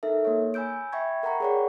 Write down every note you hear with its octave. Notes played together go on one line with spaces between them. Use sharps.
D#4 A4 A#4 E5
A#3 C#5
G#5 B5 E6 G6 D7
E5 G5 B5 C#6 G#6
A#4 F#5 G5 A#5 B5 C#6
G#4 A#4 C#5 D5 F#5